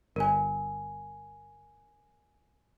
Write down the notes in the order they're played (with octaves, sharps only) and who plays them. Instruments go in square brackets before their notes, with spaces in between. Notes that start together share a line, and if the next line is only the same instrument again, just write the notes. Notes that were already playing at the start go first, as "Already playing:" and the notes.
[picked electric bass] G1 [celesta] A#4 G#5